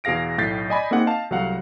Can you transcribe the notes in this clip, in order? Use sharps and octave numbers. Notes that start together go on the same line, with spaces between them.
E2 B2 G#4 F5 A#6 D7
B1 A2 G6 A6 B6 C7
D5 D#5 G#5 B5
A#3 C4 D#4 G#4 F#5
D#5 F5 A5
C2 F#3 A3 F5 F#5